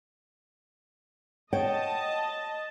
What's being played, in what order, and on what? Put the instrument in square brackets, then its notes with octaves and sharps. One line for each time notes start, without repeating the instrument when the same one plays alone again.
[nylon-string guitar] C#5 F#5 G5 [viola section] D#5 A5